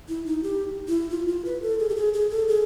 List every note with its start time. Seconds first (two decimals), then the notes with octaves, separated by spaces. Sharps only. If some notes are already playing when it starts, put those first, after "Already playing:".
0.09 E4
0.26 D#4
0.43 G4
0.88 E4
1.10 F4
1.28 F4
1.45 B4
1.62 A4
1.79 G#4
1.90 G4
1.96 G#4
2.14 G#4
2.30 A4
2.48 G#4